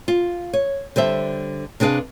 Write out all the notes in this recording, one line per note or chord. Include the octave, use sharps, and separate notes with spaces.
F4
C#5
D3 G3 C5 E5
C3 D4 G#4 B4 F5